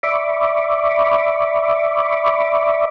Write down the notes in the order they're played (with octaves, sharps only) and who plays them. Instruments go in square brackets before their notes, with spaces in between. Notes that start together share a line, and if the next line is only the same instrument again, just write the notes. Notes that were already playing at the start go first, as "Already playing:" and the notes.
[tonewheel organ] D5 E5 B5 C#6 D6